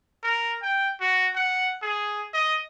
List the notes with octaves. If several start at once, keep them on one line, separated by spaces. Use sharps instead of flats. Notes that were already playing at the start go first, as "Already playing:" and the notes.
A#4
G5
F#4
F#5
G#4
D#5